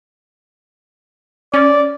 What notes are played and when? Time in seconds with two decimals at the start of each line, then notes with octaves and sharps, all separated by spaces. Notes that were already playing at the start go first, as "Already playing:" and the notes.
1.54 C#4 D5